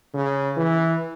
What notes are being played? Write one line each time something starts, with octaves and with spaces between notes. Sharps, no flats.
C#3
E3